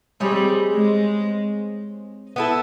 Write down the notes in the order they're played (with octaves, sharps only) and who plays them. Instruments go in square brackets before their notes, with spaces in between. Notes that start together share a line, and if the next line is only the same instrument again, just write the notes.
[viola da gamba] G3 [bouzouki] C4 D#4 G#4 C#5
[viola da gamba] G#3
[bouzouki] B3 E4 A4